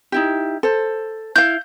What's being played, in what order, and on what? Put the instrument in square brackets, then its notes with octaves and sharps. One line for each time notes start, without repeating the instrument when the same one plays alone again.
[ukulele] D#4 E4 G4
A4 C5
[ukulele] E4 F5 [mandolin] G6